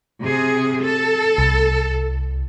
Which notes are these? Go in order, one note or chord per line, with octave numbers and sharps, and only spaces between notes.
C3 G#4
A4
C2